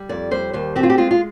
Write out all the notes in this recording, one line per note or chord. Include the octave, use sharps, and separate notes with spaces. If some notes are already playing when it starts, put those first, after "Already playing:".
Already playing: G3
F2 D5
G3 C5
D#2 C5
C4 G4
F4
G4
G#3 F4
F4